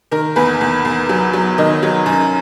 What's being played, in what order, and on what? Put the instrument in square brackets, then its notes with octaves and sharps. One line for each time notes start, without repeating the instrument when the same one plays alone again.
[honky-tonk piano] D#3 A#4
E2 B4
E2
E2
F#3
F#3
D#3 D#5
F#3
F#2